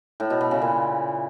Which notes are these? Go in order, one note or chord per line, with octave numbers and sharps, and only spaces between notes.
A2
B2
B2
C#3
A#2